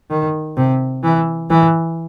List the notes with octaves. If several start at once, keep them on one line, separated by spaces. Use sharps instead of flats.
D#3
C3
E3
E3